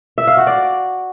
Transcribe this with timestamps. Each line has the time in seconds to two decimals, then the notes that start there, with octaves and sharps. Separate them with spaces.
0.18 E5
0.27 F5
0.37 F#4
0.47 D5